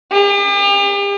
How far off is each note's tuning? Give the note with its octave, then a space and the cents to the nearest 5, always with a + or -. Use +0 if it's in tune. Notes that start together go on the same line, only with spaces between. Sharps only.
G4 +45